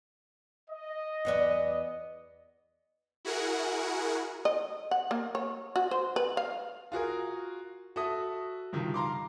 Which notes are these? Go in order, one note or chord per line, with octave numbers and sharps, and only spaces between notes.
D#5
E2 B3 D5
E4 F#4 G#4 A#4 F#5
D#5
F#5
A#3
C#5
F#4
C5
B4
F5
F4 F#4 G#4 A#4
F#4 A4 E5 D#6
G2 C3 D#3 F3
F5 A#5 C6 D6